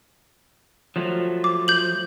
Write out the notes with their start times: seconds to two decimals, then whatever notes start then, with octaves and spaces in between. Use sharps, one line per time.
0.96 F3 F#3 A3
1.44 D6
1.68 G6 F#7